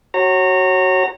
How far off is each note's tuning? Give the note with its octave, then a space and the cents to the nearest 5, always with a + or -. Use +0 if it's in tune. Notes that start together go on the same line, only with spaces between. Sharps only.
F#4 +25 C#5 -20 A#5 -25